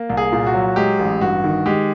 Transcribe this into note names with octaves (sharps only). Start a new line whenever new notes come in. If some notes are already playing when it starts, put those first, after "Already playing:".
Already playing: A#3
C2
G#4
A#2
F#4
F#3
G#3 G4
A1
G2 F#4
D#3
G#3 G4